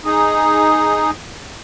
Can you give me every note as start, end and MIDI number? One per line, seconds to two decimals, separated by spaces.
0.05 1.11 63
0.05 1.11 68